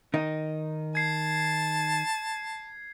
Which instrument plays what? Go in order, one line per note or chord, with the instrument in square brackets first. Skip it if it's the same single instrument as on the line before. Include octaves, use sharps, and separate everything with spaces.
[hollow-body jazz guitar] D#3 D#4
[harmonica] A5 [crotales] G#6 C7